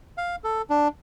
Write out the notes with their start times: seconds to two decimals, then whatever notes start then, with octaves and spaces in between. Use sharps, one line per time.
0.18 F5
0.44 A4
0.70 D4